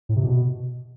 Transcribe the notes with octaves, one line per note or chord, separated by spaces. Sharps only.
A2
C3
B2